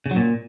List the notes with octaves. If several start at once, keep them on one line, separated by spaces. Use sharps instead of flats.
C#3
F#3
A#2